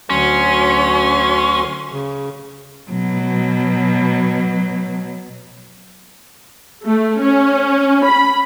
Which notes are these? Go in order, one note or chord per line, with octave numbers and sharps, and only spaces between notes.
D2 F#3 C#4 C6
C#3
B2 F#3
A3
C#4
B5